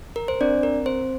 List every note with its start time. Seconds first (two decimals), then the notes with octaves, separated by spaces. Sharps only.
0.16 A#4
0.28 C5
0.41 C4 D4 D5
0.63 A#4
0.86 C4 C5